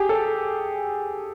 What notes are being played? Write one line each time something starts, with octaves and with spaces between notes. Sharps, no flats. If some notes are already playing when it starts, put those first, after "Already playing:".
Already playing: G4 G#4
A4